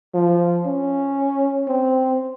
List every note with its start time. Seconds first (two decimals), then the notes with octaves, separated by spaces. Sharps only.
0.14 F3
0.66 C#4
1.68 C4